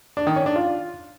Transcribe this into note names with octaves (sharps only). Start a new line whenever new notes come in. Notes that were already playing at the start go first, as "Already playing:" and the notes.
D4
D#3
C#4
D4
F4